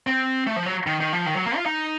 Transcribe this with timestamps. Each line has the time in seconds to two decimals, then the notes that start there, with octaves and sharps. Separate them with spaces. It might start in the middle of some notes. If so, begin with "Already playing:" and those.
0.07 C4
0.47 A3
0.56 F3
0.66 F#3
0.87 D#3
1.00 D#3
1.13 F3
1.26 D#3
1.36 F#3
1.46 A#3
1.56 F4
1.66 D#4